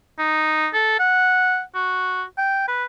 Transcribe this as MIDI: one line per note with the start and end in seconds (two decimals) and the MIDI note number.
0.19 0.68 63
0.74 0.94 69
0.99 1.62 78
1.75 2.23 66
2.38 2.64 79
2.68 2.85 71